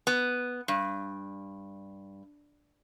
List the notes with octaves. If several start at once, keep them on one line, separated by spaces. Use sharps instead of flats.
B3
G2